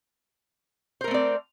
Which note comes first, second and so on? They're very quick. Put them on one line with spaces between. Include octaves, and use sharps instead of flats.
C5 A#4 A3 C4 D5